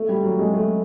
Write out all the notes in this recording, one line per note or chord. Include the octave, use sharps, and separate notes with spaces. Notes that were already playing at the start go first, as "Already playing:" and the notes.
Already playing: A3
G3
F#3
G#3
A3